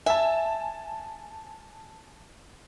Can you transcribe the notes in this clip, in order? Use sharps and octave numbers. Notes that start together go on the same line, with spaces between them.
E5 G#5 A5